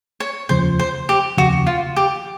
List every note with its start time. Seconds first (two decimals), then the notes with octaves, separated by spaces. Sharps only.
0.20 C#5
0.49 F1 D#2 C#3 F3 C5
0.79 C5
1.09 G4
1.37 F1 D#2 C#3 F3 F#4
1.67 F4
1.96 G4